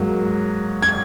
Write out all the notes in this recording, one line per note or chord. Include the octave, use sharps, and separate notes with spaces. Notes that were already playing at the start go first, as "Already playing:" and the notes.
Already playing: G#2 F#3 A#3
G#6